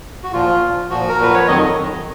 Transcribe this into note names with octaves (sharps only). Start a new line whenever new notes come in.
F#4
A#2 F3 F4
A#2 F3
A#2 F3 F#4
A#4
A#2 F3 B4
C#5
F2 D#3 F#3 D#5
F2 D#3 F#3